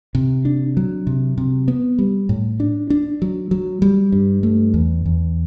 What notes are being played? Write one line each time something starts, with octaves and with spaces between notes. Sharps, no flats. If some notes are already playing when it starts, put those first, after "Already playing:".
C3
D4
F#3
C3
C3
B3
G3
A2
D4
D4
F#3
F#3
G3
G2
A3
E2
E2